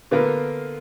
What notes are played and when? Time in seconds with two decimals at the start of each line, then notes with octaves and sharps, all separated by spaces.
0.11 D3 A#3 B3 F4 A#4 B4